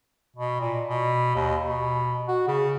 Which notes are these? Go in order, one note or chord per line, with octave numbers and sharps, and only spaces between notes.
B2
A#2
B2
D#2
B2
F#4
C#3